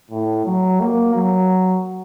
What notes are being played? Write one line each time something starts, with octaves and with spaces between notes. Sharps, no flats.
A2
F#3
A#3
F#3